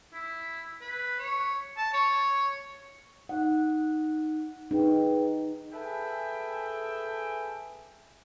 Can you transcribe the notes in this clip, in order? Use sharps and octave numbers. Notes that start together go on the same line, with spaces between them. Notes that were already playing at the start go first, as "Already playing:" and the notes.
E4
B4
C#5
A5
C#5
D#4 F#5
D#4 G#4 B4 G5
G#4 A4 B4 E5 G5 G#5